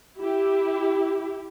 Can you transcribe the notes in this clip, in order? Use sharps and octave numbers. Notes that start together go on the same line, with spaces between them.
E4 G4